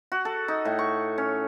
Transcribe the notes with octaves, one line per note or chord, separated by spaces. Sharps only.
F#4
A4
D#4
A2
C#6
C#4